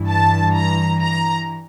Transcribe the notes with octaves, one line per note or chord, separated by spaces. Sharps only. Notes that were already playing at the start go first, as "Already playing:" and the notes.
Already playing: G2 E3
A5
A#5
A#5